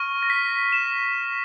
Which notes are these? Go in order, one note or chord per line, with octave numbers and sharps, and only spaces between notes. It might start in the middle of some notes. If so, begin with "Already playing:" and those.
Already playing: C#6 F6
A#6
B6
E7